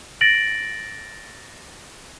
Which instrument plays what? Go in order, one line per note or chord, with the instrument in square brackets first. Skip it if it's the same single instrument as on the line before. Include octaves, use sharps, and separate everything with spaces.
[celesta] A6 A#6 D7 F#7